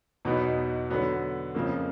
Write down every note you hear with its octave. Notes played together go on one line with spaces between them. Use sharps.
E2 B2 F#3 B3 D#4
D3 F#3 B3
F2 C#3 F3 A#3